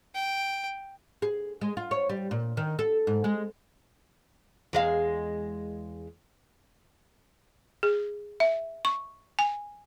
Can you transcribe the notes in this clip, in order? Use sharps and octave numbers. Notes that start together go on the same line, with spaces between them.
G5
G#4
G#3
F4
C#5
G3
A#2
D#3
A4
G#2
G#3
E2 G#3 F5
G#4
E5
C#6
G#5